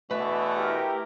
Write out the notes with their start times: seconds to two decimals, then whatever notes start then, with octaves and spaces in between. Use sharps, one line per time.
0.11 B2 D3 E3 A3 B4
0.58 E4 G4 A#4